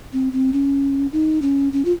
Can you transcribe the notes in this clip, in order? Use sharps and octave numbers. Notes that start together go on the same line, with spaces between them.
C4
C4
C#4
D#4
C#4
C#4
F4